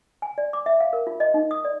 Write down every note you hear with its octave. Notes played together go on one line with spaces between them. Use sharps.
G#5
D5
D6
E5
F5
A#4
F4
D#5
D#4
D#6
D5